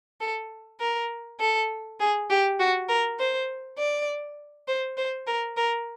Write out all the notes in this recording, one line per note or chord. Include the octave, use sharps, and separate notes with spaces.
A4
A#4
A4
G#4
G4
F#4
A#4
C5
D5
C5
C5
A#4
A#4